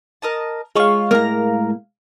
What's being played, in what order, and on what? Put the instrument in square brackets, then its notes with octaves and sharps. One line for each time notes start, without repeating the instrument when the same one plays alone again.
[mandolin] A#4 D#5 A5
[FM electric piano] G#3 F5 [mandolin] F4 C#5 C#6
[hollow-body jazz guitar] A2 A#3 [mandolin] A#4 A#5